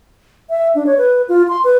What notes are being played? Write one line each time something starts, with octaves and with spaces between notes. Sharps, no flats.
E5
D4
C#5
B4
F4
C6
B4